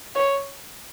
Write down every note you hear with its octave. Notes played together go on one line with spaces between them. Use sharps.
C#5